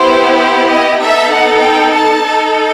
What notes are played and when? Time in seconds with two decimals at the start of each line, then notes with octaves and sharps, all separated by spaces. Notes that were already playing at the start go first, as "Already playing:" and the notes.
Already playing: B3 E4 G4 C5
0.38 C5
0.68 D#5
1.00 B3 D#4 A4 E5
1.31 F#5
1.62 G5
1.93 A5
2.25 D#4 A4